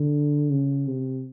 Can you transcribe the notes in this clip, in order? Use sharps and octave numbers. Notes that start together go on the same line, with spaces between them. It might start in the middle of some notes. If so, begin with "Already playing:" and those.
Already playing: D3
C#3
C3